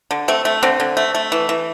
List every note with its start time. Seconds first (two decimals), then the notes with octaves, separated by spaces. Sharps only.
0.11 D3
0.28 A3 C4
0.45 A3
0.63 D3 C4
0.80 D3
0.97 A3
1.15 A3
1.32 E3
1.49 E3